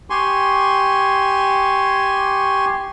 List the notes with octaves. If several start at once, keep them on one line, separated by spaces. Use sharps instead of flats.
G4 G#5 C6 C#6